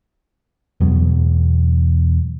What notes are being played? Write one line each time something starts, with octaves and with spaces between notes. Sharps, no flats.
E2 B2 F#3